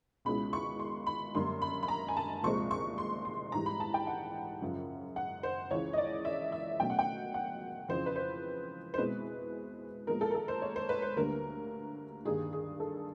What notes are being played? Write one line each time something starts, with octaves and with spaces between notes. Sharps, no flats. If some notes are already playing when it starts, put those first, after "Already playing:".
C#2 B2 G#3 C#4 E4 B5
C#6
C6
B5
F#2 D3 G3 A#3 D4 C6
B5
B5
A#5
G#5
A5
C2 A#2 F3 G#3 C4 C#6
C#6
C6
C6
G#2 E3 G3 A#5
B5
A5
G5
F#5
F#2 C#3 F3
F#5
C5
C#2 C#3 E3 C#5
D#5
D5
E5
E5
B2 F#3 A3 C#4 G5
F#5
G5
F#5
F2 C#3 E3 C5
B4
C5
C5
B2 G#3 C4 E4 B4
A#2 F3 G#3 B3 A#4
A4
A#4
A4
C5
C#5
C5
B4
C5
D2 D3 G3 A#3 A#4
G2 D#3 G3 A#3 D4 G#4
G#4
A4